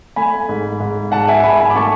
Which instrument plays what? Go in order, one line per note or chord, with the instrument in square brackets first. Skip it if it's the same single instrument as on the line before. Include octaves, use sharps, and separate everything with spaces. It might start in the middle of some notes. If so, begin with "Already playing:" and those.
[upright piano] A3 G#5 B5
G#2
G#2
G#2 F#5 A5
E5 G#5
G#2 G#5 B5
G#5 B5
D6
A3 A5 C#6